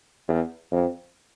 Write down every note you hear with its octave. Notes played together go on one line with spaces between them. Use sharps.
E2
F2